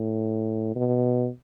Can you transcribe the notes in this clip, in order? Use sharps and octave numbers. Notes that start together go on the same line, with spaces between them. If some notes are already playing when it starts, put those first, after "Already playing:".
Already playing: A2
B2